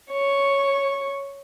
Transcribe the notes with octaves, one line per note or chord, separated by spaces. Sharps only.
C#5 C#6